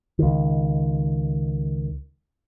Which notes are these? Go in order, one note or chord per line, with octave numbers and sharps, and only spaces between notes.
C#2 D#3